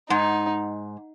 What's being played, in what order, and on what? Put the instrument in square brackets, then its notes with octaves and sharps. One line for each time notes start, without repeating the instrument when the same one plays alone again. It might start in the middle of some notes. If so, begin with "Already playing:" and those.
[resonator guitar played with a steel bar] G#2 [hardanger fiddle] D#4